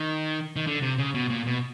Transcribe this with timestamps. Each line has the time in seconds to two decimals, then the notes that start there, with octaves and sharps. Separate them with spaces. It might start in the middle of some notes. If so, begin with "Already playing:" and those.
Already playing: D#3
0.56 D#3
0.67 D3
0.82 C3
0.98 C#3
1.15 B2
1.30 A#2
1.46 B2